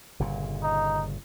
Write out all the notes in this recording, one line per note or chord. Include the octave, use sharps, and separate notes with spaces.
G1 A#2 C#3
D#4